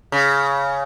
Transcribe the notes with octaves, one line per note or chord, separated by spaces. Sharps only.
C#3